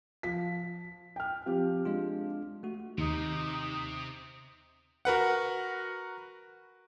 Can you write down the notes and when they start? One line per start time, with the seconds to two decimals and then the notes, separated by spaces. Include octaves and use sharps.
0.23 F3 B6
1.16 G5 F6
1.46 F3 C4 G4
1.85 G#3 D4 F4
2.63 A3 F#4
2.98 D#2 C3 D#4
5.05 F#4 A#4 B4 F#5